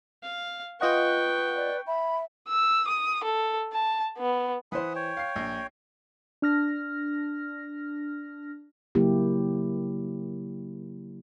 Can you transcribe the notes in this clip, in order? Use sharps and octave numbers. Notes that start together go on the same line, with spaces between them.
F5
F4 B4 D#5 F#5 G5 C#6
D5
E5 B5
E6
D#6
A4
A5
B3
E3 C5 F#5 B5 D#6
C#5 G5
F5 C7
A#1
D4 F6 A#6
C#3 F#3 A#3 E4 G4